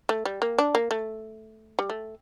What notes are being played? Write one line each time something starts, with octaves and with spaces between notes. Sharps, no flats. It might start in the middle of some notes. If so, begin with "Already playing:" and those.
A3
G3
A#3
D4
A#3
A3
G3
A3